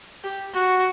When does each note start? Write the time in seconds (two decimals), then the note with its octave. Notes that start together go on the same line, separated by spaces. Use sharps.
0.24 G4
0.54 F#4